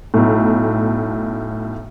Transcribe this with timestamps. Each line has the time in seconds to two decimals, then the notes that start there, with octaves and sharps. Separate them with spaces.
0.14 B1 A2